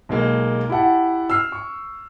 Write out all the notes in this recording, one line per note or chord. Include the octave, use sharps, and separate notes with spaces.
B1 G#3 A#3
E4 G4 F#5 A5
E6 F6 C7
C#6